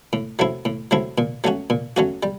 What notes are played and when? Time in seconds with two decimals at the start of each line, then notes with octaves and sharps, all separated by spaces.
0.13 A2
0.39 F#3 A3 C4 E4
0.65 A2
0.91 F#3 A3 C4 E4
1.18 A#2
1.44 F#3 A3 C#4 F#4
1.70 A#2
1.96 F#3 A3 C#4 F#4
2.23 G3